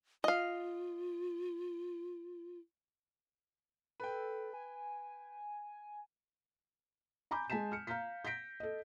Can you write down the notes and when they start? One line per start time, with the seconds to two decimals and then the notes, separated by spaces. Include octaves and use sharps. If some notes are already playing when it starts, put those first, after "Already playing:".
0.24 F4 D#5 F5
4.00 A4 B4 G5
4.53 G#5
7.31 G#5 A#5 B5 D6 G6
7.50 G#3 G#5 A5 B6 E7
7.72 F6 C#7
7.87 F5 A#5 F6 G6 B6
8.25 G6 A#6 B6 D7
8.60 A4 D#5